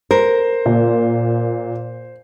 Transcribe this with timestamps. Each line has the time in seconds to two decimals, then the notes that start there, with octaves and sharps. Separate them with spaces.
0.11 A#4 C5
0.66 A#2